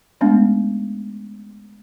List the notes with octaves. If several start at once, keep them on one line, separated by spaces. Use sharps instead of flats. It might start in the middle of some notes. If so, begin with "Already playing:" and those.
G#3 A3 B3 C#4 D4